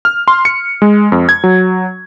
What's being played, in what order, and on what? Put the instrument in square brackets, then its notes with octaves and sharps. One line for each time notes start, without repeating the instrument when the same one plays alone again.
[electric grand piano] F6
C6
C#7
G#3
F2
G#6
F#3